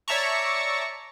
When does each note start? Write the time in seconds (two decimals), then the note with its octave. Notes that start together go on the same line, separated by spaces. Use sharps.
0.08 C#5 D5 E5 A5 A#5 C#6